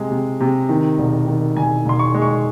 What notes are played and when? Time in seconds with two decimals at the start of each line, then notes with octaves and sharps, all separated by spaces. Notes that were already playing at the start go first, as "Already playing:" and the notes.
Already playing: C3 G#3
0.11 C3
0.40 C3
0.69 D#3
0.98 E1
1.27 D#3
1.56 E1 G#5
1.86 E1 C6
1.99 C#6
2.15 G#3
2.22 C#6